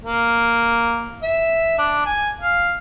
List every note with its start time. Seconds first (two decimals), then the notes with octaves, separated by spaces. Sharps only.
0.04 A#3
1.23 E5
1.78 D4
2.05 G#5
2.40 F5